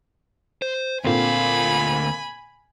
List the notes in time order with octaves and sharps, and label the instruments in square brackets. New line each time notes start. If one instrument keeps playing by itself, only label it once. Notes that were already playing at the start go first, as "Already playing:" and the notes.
[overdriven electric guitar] C5
[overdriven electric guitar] D2 F5 [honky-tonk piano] A#2 D3 C4 [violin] G#5 B5